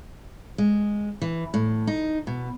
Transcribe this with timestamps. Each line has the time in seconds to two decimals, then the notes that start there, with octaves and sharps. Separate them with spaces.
0.58 G#3
1.22 E3
1.54 A2
1.87 D#4
2.27 B2